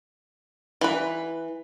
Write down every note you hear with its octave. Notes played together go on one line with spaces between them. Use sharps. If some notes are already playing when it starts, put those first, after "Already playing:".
E3 B4